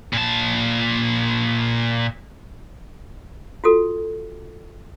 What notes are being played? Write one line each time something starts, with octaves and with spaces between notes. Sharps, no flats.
A#2 A5
F4 F#4 A4